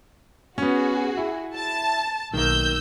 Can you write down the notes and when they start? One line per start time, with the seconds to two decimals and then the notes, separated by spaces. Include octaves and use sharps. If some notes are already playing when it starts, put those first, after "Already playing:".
0.58 B3 C#4 F#4 G#4
1.17 E4
1.54 A5
2.33 B1 D#3 A#3 E6 G6